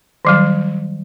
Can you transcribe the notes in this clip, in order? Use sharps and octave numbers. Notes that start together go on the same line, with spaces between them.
D#3 F#3 G3